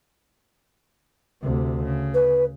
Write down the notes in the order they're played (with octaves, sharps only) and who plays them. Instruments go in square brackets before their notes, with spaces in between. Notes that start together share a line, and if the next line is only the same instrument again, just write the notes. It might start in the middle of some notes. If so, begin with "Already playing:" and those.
[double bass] D2 C3
C#3
[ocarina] B4